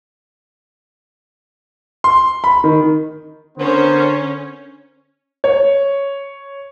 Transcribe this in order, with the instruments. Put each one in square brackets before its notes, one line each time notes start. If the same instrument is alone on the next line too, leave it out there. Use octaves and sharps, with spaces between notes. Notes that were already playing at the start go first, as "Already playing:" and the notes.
[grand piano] C6
B5
D#3
[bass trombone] D3 [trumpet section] B3 A#4 C5 [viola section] C#4
[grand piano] C#5